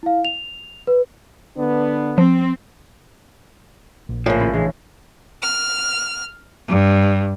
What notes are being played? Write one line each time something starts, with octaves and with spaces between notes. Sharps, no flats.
E4 F5
F7
B4
D3 B3 D4
F3 C4
A#1
A2 C#3 F3 A#3
D#2 C#4 B5
E3 G#3 D4
F6
G2